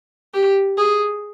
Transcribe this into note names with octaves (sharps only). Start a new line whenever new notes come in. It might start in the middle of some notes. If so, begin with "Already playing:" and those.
G4
G#4